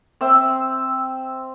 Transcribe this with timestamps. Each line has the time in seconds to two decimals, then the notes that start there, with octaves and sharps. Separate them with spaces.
0.21 C4 E5 E6